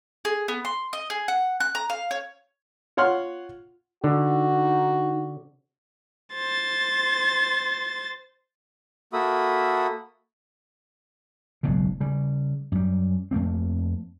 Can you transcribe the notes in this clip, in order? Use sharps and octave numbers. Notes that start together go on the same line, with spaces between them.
G#4
B3
C6
D#5
G#4
F#5
F#6
A#5
F5
C#5
F4 C#5 F#5 C6 F6
D3 D#4 F#4
C5 A6
A#3 F#4 A4 E5 B5 D#6
F#1 B1 G#2 C#3
C#3 G3
F#2 G3
F2 A3 A#3 C4